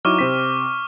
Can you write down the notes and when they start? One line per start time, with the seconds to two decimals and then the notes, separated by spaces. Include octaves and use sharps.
0.05 F#3 D#4 E4 C#6 D6 F6
0.19 C3 C4 B6